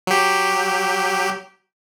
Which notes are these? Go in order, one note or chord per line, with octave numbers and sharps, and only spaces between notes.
F#3 G4